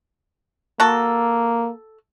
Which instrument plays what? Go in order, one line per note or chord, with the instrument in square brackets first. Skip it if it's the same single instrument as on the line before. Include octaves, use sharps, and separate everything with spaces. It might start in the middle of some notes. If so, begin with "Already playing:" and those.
[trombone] A#3 [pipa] F#4 A4